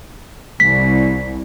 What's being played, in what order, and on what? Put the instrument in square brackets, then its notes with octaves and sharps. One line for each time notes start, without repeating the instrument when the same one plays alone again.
[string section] C2 [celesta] B6